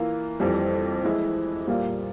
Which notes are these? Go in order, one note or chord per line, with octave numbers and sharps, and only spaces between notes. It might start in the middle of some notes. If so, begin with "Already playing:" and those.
Already playing: E3 A#3 F4
F2 E3 G3
E3 G#3 E4
A#2 G3 A#3 F4